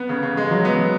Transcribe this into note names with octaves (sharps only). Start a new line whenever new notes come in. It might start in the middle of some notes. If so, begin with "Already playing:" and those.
Already playing: B3
C#3
C#3
G#3
F#3
B3